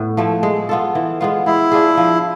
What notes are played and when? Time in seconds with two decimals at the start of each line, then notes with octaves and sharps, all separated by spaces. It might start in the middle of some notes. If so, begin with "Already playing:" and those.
Already playing: A2 B3
0.17 F3 A3 E4
0.43 G#3
0.69 B3 F4 A4
0.95 E3
1.21 G#3 B3 F4
1.46 G#3 E4
1.72 D4 F4 G#4
1.97 F3